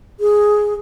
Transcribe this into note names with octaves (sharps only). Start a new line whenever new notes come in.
G#4